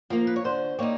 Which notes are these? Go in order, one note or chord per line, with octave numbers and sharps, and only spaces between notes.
F3 A#3 A#4
B4
C#5
D3 C5
G3 A#3 D#4 C#5